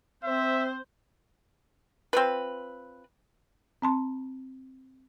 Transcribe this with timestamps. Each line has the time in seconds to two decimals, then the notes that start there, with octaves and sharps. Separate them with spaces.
0.24 C4 C5 E5
2.13 C4 F4 B4
3.82 C4 A5 C6